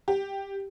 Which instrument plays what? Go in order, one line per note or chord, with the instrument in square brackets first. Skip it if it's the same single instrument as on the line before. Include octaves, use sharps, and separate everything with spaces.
[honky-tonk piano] G4